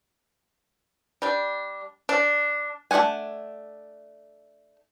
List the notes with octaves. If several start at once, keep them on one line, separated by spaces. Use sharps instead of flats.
G3 D4
D4
A3 D4 D5 F#5 G#5